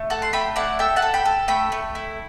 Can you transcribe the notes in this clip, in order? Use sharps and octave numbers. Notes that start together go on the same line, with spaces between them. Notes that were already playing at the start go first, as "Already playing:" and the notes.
Already playing: A3
A4 F#5 A5
C6
A3 G5 B5
E4 D5 F#5
A4 E5 G5
F#5 A5
A4
G5 B5
A4
A3 G5 B5
A3
E4